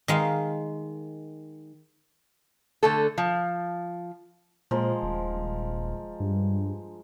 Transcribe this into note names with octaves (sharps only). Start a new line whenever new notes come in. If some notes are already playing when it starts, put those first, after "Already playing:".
D#3 G#3 F5
D3 A3 A4
F3
A#2 F3 G#3 A#4
D#1
G2